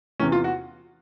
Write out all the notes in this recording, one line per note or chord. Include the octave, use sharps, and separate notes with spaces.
E2 C3 E3 C#4
F4
F#4